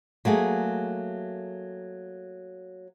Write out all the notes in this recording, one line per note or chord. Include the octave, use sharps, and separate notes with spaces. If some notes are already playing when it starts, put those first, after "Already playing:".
F#3 A3 A#3 G#4